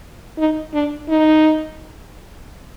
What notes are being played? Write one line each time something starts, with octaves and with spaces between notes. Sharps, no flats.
D#4
D4
D#4